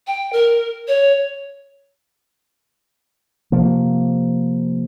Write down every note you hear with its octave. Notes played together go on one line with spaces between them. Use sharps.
G5
A#4
C#5
C3 F3 A#3